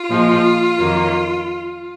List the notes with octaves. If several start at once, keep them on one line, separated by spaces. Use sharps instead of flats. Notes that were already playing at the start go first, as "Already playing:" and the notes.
Already playing: F4
A#2 F3 G#3
F2 D#3 F#3 A#3